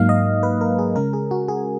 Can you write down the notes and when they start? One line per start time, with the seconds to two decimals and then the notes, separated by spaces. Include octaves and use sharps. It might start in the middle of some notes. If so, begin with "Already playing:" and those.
Already playing: G#2 F#3 A#3 D#4 F5
0.09 D#5
0.43 B4
0.61 A#4
0.79 G#4
0.96 C#3 G#3 C#4 A#4
1.13 G#4
1.31 F#4
1.48 G#4